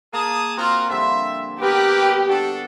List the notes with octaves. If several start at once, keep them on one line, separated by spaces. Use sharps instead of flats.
A#3 G#4 A5 D#6
C4 F4 F#4 A#4
D3 F3 G3 E5
B3 G4 A#4 B4
D4 F#4 A4